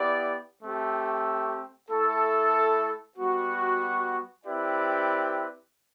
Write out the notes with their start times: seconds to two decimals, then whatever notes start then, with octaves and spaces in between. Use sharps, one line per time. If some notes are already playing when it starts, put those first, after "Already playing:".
Already playing: B3 E4 G4 D5
0.62 A3 C4 G4
1.90 A3 E4 A4
3.18 G3 B3 F#4
4.45 C4 E4 G4 B4 D5